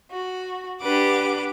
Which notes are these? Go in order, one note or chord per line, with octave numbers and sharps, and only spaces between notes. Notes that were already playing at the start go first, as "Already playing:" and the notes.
F#4
D4 G4 B4 F#5 D6